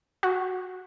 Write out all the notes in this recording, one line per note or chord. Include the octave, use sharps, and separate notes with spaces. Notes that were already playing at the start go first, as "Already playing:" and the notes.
F#4